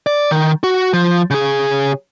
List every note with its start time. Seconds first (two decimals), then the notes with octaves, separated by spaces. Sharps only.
0.07 D5
0.31 D#3
0.63 F#4
0.93 F3
1.31 C#3 G#4